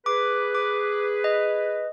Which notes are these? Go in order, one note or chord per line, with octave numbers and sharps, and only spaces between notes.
G#4 B4 D6
D6
D#5